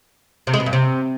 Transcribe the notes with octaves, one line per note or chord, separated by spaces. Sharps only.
C3
G#3
B2
G2
C3